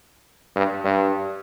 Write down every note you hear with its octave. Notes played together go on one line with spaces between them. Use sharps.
G2
G2